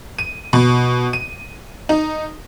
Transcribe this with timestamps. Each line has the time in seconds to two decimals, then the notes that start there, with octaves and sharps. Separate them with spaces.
0.18 D#7
0.53 B2
1.13 D#7
1.89 D#4